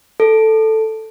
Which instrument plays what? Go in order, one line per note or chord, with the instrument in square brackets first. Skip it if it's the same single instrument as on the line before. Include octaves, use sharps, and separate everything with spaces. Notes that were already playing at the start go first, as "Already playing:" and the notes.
[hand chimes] A4